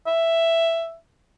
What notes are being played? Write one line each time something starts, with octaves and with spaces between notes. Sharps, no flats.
E5